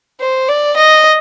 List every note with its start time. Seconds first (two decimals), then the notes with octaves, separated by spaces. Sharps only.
0.21 C5
0.48 D5
0.76 D#5